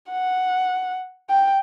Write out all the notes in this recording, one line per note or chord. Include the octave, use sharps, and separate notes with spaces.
F#5
G5